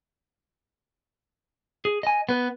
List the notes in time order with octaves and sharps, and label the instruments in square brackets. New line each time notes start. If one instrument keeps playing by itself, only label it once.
[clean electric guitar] G#4
D#5 G#5
B3 B4